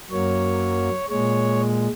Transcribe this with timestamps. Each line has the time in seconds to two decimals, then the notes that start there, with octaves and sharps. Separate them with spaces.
0.11 F#2 F#3 A#3 C#5
1.09 A#2 G#3 C#5